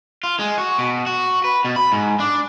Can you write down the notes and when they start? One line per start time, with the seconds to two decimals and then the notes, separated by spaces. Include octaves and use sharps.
0.24 F4
0.39 G#3
0.58 F#4
0.78 B2
1.06 F#4
1.44 B4
1.65 B2
1.76 B5
1.92 G#2
2.20 D4